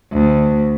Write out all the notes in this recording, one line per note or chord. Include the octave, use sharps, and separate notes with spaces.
D2